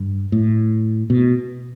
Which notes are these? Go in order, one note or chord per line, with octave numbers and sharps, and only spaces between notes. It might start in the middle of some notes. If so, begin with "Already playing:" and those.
Already playing: G2
A2
B2